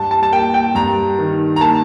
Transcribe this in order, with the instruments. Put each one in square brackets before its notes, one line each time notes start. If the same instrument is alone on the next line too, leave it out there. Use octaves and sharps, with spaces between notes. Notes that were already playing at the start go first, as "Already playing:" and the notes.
Already playing: [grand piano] G2 A5
A5
A5
A#3 G5
G5
G2 A#5
D#3
A#5
A#3 A5